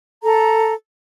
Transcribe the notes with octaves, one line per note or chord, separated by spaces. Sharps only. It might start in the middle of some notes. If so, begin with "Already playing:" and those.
A4 A#5